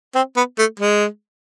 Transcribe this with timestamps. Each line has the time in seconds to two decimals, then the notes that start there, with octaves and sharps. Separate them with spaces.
0.15 C4
0.36 B3
0.59 A3
0.80 G#3